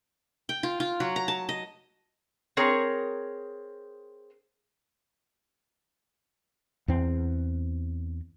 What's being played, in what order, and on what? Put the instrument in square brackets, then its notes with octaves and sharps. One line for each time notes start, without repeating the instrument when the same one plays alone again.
[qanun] G5
F4
F4
F#3
A#5
A5
D#5
[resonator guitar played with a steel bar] C4 G#4 A#4 C#5
[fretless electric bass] E2 C4